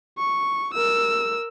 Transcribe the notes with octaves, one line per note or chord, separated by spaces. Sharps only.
C#6
A#4 E6